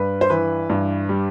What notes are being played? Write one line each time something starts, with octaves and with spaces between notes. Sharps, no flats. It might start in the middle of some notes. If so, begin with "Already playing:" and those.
Already playing: G2 B4
C5
E3 B4
G2
G3